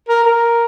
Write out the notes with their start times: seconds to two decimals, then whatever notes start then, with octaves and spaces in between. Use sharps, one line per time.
0.08 A#4
0.24 A#4